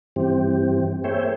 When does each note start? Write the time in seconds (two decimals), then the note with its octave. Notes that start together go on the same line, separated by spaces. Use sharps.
0.16 G2 E3 C4 G4
1.04 A#3 G#4 C5 C#5 E5 G5